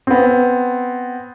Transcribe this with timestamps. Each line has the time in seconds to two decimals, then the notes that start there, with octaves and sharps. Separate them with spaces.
0.07 B3 C4